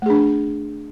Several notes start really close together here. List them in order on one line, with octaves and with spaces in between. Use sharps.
A3 G#4 D4